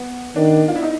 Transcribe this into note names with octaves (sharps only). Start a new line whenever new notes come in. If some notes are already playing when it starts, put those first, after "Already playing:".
Already playing: B3
D#3 D4
F4
E4
D#4